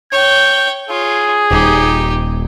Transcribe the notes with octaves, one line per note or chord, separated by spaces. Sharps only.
C#5 G5 G6
F4 G#4 C#5
D#1 D#4 G4